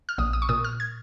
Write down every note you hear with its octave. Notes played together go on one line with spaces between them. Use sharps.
F6
A#1 D#6
D#6
C#6
A#2 D#6
F6
G#6